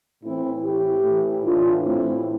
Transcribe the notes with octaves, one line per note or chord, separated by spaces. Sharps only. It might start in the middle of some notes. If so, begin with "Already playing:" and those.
A2 E3 C4 E4
A2 E3 E4 G4
A2 E3
A2 E3 D4 F4
A2 E3 C4 E4